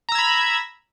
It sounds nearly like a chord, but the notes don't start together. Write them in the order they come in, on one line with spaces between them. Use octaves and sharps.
A#5 E6 G#6 B5